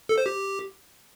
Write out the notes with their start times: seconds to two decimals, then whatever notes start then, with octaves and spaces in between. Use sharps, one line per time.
0.09 A4
0.18 C5
0.26 G4